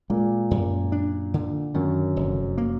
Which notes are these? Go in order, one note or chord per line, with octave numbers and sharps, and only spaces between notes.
A#2 G#3 A#3
F#2
D4
D3
F#2 D#3 F#3
F1
A#3